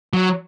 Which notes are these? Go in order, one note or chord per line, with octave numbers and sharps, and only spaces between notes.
F#3